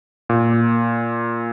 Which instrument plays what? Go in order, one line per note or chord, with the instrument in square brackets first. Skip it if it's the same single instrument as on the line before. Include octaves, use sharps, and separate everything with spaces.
[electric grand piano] A#2